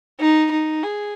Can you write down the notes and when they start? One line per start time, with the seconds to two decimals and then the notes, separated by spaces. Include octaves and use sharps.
0.19 D#4
0.51 D#4
0.83 G#4